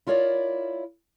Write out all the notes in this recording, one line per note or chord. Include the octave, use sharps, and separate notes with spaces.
E4 F4 A#4 C#5 D5